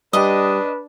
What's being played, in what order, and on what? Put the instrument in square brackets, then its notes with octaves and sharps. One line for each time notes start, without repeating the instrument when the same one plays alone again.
[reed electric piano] G3 G4 [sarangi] D4 [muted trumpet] B4 [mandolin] D#5